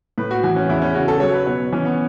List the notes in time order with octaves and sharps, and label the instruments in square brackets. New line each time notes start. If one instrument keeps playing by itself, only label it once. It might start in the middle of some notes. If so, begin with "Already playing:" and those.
[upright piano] A2 [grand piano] B4
[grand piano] F#4
[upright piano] E3 [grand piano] F#4
[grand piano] C#4
[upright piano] E2 [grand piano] E4
[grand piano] C#4
[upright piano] C#3 [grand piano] F#4
[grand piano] A4
[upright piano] F#3 [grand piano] C#5
[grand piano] B4
[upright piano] B2 [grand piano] C#5
[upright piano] E3 [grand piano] C#4
[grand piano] B3